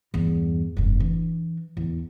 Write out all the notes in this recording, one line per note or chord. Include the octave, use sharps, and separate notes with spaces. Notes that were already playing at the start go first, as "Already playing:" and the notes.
E2 G2
F1 G2
E3 D4
E2